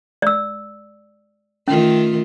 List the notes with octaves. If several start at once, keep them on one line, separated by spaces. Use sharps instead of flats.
D5 E6
D#3 A3 C#4 F4